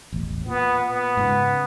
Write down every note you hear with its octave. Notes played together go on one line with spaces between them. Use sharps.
E1 A1
A#2 B3
B3
G#2 C#3